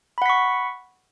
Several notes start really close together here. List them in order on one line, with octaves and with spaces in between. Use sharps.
B5 F#5 B6 C#6